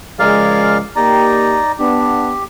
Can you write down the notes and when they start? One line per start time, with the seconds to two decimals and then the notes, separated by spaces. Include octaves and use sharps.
0.19 C#3 F3 G#3 A#4 D5 F5
0.96 A#3 D#4 G4 D5 A#5
1.79 B3 D4 G4